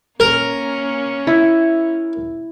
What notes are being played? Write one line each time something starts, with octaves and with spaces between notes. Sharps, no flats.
A#3 C#4 A#4
E4